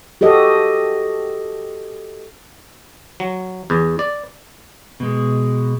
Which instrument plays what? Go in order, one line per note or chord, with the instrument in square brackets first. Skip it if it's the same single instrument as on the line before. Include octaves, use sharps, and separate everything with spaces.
[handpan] F#4 G4 A4 D#5
[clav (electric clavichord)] F#3
E2
D5
[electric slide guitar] B2 G#3